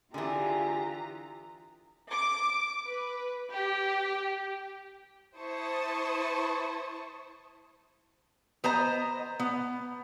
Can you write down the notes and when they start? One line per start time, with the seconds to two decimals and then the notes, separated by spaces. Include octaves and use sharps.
0.14 D3 E3 F4 G4 G#4 A#5
2.10 D6
2.86 B4
3.53 G4
5.36 E4 C5 A5 C#6 D#6
8.64 B3 C5 D#5 A#5
9.40 B3